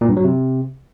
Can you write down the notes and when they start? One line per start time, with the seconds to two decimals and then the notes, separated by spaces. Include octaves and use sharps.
0.01 A#2
0.09 G2
0.17 F#3
0.24 C3